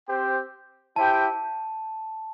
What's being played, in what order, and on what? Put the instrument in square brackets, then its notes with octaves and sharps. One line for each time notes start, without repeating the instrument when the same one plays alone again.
[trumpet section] C4 G4 C5 G5
[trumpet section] E4 G4 C5 G5 [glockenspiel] A5